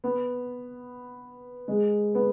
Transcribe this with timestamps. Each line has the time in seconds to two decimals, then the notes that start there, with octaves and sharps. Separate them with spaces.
0.04 B3
1.68 G#3
2.15 B3